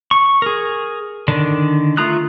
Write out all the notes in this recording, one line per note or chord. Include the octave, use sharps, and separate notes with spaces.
C#6
G#4 A#4
D3 D#3 D4
A3 F4 A#5 D#6 F#6